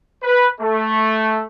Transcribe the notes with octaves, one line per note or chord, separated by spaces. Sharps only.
B4
A3